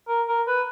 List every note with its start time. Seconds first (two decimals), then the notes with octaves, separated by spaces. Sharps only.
0.08 A#4
0.28 A#4
0.47 B4